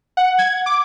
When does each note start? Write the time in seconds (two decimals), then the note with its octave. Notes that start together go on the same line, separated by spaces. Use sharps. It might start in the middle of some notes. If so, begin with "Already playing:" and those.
0.17 F#5
0.38 G#6
0.66 D6